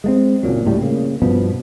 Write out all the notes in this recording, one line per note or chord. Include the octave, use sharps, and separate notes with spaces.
G#3 A3 C4
F#1 A#2 F#3
C#2 A2 G3
C#3 A#3
G2 B2 F3 B3